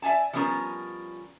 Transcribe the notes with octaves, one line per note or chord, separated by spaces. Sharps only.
D5 E5 F#5 G#5 A5
F3 G3 B3 C#4 A#4